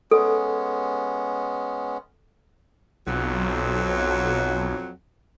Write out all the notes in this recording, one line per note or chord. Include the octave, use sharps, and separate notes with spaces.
G#3 B3 C#4 A4
B1 F2 F#3